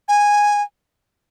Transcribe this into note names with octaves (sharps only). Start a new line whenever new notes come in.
G#5